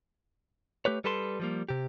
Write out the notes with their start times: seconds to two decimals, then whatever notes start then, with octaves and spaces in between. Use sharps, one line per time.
0.85 A3 G4 B4 C#5
1.04 G3 A4 B4 A5 C6
1.40 F3 G3 A#3
1.69 C3 G4